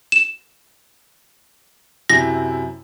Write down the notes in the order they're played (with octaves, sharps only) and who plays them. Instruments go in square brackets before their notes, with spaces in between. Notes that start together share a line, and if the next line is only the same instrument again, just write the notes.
[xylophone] E7
[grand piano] F#2 C3 E4 [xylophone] A#6